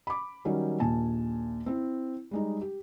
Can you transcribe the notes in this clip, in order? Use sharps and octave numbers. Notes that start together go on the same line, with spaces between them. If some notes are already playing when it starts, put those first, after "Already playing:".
B5 D6
D#3 F#3 G3 C#4
A#1 D#2 A#2 G#5 A5
C4 E4
G3 G#3 D#4
G4